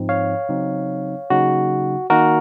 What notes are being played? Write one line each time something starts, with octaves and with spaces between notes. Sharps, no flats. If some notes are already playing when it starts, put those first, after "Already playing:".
Already playing: G#2 F3 C4 D#4
C#5 F5
C#3 F#3 C4 D#4
C#3 F#3 A#3 D#4 F#4
D#3 A#3 D#4 F#4 A#4